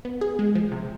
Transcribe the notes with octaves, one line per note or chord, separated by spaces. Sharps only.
B3
G#4
G#3
F3
C3